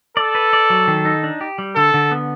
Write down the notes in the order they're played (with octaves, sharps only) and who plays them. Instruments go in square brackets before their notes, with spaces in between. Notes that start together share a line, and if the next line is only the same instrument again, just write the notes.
[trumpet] A4 [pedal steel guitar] D5
[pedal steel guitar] B4
D5
F#3
D#3
D#4
D4
G4
G3
[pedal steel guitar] D3 [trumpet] A4
[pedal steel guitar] D3
B3